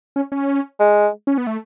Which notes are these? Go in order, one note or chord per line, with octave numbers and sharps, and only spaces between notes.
C#4
C#4
G#3
C#4
B3
A3